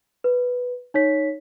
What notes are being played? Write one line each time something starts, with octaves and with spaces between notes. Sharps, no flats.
B4
D#4 C#5 B6